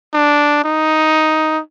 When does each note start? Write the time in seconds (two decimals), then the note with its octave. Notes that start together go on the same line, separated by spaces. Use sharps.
0.14 D4
0.64 D#4